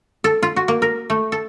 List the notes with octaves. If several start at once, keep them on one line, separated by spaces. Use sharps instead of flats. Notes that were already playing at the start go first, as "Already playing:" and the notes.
A4
F4
F#4
A#3
A#4
A3
A4